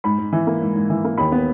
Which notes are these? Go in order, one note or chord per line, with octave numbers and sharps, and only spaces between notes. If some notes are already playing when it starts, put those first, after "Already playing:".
G#2 B5
G#2
E3
A#3
G#2
G#2
E3
A#3
D#2 B5
B3